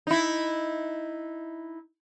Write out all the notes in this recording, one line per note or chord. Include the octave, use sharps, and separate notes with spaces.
D#4 E4